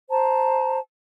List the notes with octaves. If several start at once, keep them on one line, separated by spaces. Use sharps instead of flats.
C5 A5 A#5